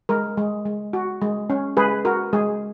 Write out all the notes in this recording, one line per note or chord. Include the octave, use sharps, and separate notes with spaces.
G#3 A#4
G#3
G#3
F#4
G#3
C#4
G#3 G#4 B4
F#4 A#4
G#3 G#4